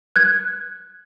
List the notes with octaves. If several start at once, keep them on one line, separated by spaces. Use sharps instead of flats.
F#6 G#6